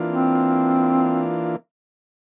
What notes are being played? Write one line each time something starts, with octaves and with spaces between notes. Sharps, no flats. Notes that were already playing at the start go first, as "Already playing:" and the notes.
Already playing: E3 A#3 D4 F4
C4